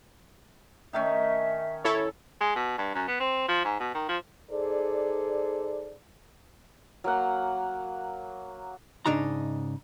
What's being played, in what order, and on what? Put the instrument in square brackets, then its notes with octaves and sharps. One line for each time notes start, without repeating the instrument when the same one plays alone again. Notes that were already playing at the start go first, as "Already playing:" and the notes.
[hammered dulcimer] D#3 A3 C#4 [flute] E5
[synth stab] E4 A4 C#5
[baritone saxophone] G#3
B2
G2
F#2
B3
C4
F3
G#2
B2
D#3
F3
[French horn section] D#4 G#4 A4 C5 D5
[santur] F#3 A#3 F#5
[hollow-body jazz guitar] G#2 C#3 D4 D#4 A#5